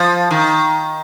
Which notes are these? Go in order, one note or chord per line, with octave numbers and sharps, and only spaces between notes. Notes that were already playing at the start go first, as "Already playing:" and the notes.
Already playing: F3
D#3